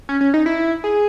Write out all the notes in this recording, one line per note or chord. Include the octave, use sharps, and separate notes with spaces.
C#4
C#4
D#4
E4
G#4